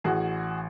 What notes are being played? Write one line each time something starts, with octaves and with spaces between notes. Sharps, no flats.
A1 F#4 G#4